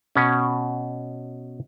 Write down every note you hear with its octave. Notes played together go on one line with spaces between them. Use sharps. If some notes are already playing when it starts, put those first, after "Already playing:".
B2 C#4